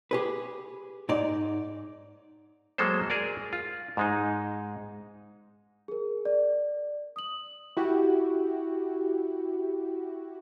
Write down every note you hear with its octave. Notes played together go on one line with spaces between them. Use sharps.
G4 G#4 B4
G#2 D#4 D5
F#3 G#3 A#3 A4 C5
G#4 A#4 D5
F4
G#2 G#3 D#4
G#4 A#4
D5
D#6 F#7
E4 F#4 G4